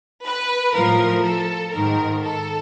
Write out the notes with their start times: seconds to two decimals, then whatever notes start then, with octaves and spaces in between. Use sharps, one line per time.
0.25 B4
0.75 A2 F3 A#4
1.24 A4
1.73 G#2 D#3 A#4
2.23 A4